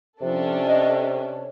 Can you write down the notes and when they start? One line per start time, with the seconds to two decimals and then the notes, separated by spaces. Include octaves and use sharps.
0.22 C3 F3 C#4 D4 A4
0.67 D#5
1.01 C#5